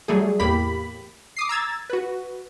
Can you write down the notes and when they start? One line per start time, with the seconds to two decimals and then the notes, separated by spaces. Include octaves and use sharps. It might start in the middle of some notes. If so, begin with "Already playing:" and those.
0.08 F#3 G3 A3 G#4
0.40 E2 A2 A#3 G4 B5 B6
1.36 D6 D#6 C7
1.49 A#5 E6 G#6 A6
1.90 F#4 B4